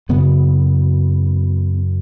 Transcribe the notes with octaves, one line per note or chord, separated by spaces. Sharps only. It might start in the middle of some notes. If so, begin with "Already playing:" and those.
F#2 C#3 B3